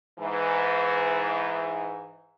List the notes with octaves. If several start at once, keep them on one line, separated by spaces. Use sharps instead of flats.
G#2 E3